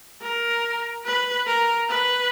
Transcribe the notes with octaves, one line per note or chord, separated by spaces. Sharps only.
A#4
B4
A#4
B4